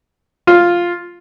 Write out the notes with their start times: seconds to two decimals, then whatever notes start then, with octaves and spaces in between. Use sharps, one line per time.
0.47 F4